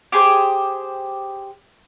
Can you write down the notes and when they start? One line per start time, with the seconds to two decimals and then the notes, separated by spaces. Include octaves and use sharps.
0.12 G4 G#4 C5 D6